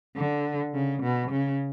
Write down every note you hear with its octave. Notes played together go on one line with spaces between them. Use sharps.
D3
C#3
B2
C#3